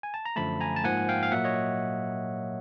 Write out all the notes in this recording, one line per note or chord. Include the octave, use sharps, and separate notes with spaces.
G#5
A5
A#5
F#2 D3 F3 A3 A5 B5
G#5 A#5
A5
G#2 F3 A#3 F#5 G#5
F5 G5
F5
A#2 F#3 A#3 E5 F#5
C#5 D#5